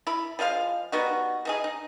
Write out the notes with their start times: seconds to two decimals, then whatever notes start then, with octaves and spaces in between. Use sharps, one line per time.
0.07 E4 B5
0.39 F3 G#3 E4 F5
0.92 G3 B3 D#4 F#4
1.45 E3 D#4 G#4
1.64 D#4